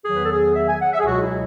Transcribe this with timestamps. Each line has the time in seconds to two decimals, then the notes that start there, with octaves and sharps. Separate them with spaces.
0.05 E2 D#3 F#3 G#4
0.16 B4
0.23 A4
0.30 G#4
0.55 E5
0.68 G#5
0.80 F#5
0.93 E5
0.99 G#4
1.05 C#2 B2 F#3 F#4
1.22 E4